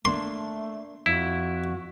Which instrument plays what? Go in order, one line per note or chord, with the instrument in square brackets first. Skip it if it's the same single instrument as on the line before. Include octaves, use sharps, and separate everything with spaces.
[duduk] A3 [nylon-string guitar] A#3 D4 [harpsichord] C6
[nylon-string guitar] F2 [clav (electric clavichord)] E4 [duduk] F#4